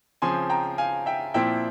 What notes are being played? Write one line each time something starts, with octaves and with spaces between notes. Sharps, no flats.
C#3 F3 C4 G#5 C6
G5 A#5
F5 G#5
E5 G5
A#2 F3 C4 E4 E5 G5